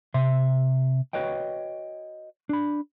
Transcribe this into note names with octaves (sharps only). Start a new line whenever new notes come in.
C3 E5 C6
F#4 B4 C#5 D#5 G5
D4 B5